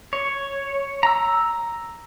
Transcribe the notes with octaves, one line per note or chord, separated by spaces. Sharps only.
C#5
A#5 E6